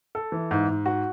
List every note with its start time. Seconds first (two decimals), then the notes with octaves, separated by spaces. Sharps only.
0.15 A4
0.32 E3
0.51 G#2
0.68 G#2
0.86 F#4